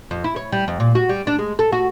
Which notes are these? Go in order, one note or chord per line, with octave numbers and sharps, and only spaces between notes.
F2
E4
C#5
G3
F2
A#2
F#4
G3
D4
G#3
A4
F#4